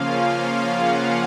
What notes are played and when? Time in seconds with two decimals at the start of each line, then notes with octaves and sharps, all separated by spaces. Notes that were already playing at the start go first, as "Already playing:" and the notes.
Already playing: C#3 F3 A#3 C#4 F4 F5
0.63 F#5